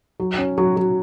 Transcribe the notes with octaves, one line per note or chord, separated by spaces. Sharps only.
F#3
C#4
F#3
F#3